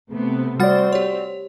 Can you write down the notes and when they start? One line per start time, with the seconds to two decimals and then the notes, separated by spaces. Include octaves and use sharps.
0.11 C3 A3 B3
0.60 G3 C4 F#4 D5 F#5 A6
0.93 G4 C#5